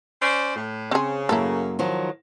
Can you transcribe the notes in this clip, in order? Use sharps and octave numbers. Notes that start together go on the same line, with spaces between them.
C#4 C5 D5
A2
C#3 C4 G#4
F#2 A#3 E4 A4
D#3 F3 F#3